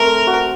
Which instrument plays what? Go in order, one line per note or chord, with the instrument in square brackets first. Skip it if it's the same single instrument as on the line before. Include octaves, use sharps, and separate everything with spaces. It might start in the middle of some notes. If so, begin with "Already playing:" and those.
Already playing: [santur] A3 C4 [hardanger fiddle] A#4
[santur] F#4